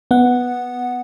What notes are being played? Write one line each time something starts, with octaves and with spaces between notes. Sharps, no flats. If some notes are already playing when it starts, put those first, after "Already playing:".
B3 F#5